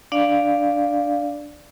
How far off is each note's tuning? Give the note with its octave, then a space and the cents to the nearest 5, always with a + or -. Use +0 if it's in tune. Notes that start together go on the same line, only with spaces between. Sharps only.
D4 +0 D5 +0 F5 +0